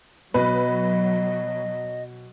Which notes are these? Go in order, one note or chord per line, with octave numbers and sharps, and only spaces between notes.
B2 F#3 B4 D#5